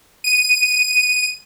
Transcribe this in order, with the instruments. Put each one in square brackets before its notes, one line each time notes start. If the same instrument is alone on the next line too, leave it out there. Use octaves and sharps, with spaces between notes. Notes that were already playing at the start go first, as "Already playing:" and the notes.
[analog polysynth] D#7